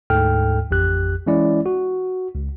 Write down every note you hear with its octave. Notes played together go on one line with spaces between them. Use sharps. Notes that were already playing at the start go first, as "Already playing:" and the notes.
D2 G#2 A4 G5 F6
A1 F2 G4 F#6
E3 G#3 C#4 E4 D5
F#4
C#2